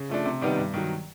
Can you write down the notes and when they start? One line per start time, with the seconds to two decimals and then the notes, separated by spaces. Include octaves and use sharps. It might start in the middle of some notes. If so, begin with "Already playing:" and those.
Already playing: C#3
0.09 F3 A3 D4
0.25 C3
0.41 D#3 G3 B3 D#4
0.57 G2
0.74 D#3 F#3